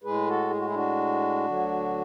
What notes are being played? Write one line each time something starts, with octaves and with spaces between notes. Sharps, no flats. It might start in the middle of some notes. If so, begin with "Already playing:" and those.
A2 G#3 G#4 B4
F#4 A4
G#4
F#4
E4 G#4
D4 F#4
D2 D3 F#3